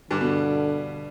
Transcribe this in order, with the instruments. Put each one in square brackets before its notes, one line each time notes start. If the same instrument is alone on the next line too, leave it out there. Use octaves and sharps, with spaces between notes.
[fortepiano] G2 [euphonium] D3
[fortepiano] B2